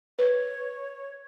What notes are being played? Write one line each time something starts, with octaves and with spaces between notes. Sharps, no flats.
B4 C#5